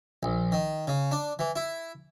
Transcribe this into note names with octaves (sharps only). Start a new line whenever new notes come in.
A#1
D#3
C#3
D4
E3
E4